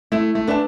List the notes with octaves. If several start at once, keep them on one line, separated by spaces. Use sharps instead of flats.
A3 E4
A3
D4 B4 E5 A5